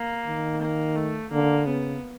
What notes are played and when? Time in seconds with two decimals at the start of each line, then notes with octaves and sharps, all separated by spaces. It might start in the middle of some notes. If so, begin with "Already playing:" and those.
Already playing: A#3
0.26 D#3
0.61 A#3
0.96 A3
1.32 D3 A#3
1.66 C#3 B3